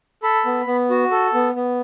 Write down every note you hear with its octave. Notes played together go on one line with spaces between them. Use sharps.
A4 B5
B3
B3
F#4
A4
B3
B3